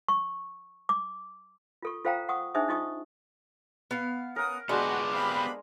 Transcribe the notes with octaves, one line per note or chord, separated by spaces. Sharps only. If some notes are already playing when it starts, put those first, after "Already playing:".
C#6
D6
F4 A4 C#6
F4 A4 C5 F5 G5 A#5
F#5 C#6 D#6
D4 D#4 G#4 C5 E5 D#6
D#4 F4 D#5 C#6 D#6
B3 F5
C#4 A#4 F#5 D#6
G#3 B3 D4 F#4 G4 C6
C4 F5 B5